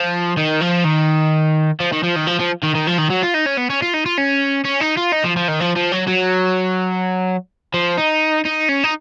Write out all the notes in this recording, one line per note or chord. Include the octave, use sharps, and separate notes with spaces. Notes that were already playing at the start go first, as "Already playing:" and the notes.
Already playing: F3
D#3
F3
D#3
F3
D#3
F3
D#3
F3
F3
D#3
D#3
F3
D#3
F#3
F4
D#4
C#4
B3
C#4
F4
D#4
F4
C#4
C#4
D#4
F4
D#4
F3
F3
D#3
F3
F3
F#3
F#3
F3
D#4
D#4
C#4
D#4